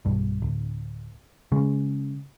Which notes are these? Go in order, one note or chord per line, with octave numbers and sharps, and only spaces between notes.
B1 G2
D1
C#3 G#3